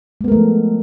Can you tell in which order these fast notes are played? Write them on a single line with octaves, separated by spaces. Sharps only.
G#3 B3 A#4 A3 F3